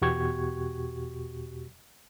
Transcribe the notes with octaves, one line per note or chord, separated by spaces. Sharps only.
E2 B2 F#4 G4 C#6 G#6